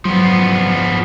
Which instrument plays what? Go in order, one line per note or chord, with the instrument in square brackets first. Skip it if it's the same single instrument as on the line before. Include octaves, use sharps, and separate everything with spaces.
[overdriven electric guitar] F3 B3 [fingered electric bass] F#3